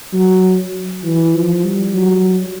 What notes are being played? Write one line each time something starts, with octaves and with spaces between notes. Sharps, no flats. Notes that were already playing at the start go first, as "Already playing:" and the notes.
F#3
E3
F3
G3
F#3